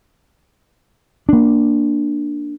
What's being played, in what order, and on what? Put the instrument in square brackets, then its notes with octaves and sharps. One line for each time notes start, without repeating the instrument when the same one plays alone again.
[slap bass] A#3 D4